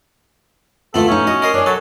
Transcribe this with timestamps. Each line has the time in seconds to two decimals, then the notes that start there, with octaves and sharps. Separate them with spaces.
0.94 D2 A3 B3 F4 A4 E5
1.08 A2 C#4 D#4
1.27 F#4 D#5
1.42 A#4 D#5 C6
1.54 D4 C#5 G#5
1.66 F#3 A4